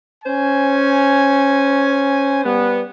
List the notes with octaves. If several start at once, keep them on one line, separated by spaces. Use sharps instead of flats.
C#4 C5 G#5
G3 B3